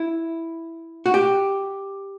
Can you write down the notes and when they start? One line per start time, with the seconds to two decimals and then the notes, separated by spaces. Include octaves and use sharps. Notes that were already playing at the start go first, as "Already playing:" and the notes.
Already playing: E4
1.06 F#4
1.14 G4